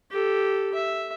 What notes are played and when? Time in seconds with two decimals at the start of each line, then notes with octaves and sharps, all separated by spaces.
0.11 G4 A4
0.75 E5